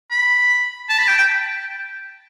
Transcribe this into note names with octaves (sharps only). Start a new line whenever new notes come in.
B5
A5
B5
G5
G5